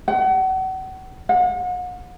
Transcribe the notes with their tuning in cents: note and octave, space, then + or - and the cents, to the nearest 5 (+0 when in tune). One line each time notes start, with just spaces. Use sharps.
F#5 +35
F#5 -40